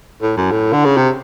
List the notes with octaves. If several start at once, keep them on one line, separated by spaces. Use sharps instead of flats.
A2
F#2
A2
D3
C#3
C3